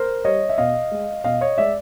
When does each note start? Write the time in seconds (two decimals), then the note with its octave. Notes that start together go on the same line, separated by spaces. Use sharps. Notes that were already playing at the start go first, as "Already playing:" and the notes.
Already playing: A#4 C5
0.24 G3 C#5 D#5
0.49 E5
0.58 B2 D#5 F5
0.91 G#3
1.24 B2 D#5 F5
1.41 C#5 D#5
1.58 G#3 D5 E5